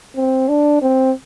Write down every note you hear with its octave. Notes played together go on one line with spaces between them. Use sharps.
C4
D4
C4